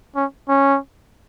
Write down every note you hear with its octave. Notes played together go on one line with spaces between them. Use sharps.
C#4
C#4